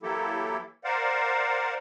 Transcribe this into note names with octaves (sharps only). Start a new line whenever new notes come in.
E3 F#3 A#3 E4 G4 A4
A#4 C5 D5 F5 F#5